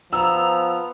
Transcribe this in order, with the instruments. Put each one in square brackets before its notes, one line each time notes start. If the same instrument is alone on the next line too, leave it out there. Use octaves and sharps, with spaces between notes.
[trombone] F3 [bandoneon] B3 [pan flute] A#5 [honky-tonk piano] E6